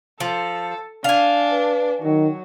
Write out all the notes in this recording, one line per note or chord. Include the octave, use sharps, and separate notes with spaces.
F3 A4
D4 F5 G#5
B4
D#3 F#3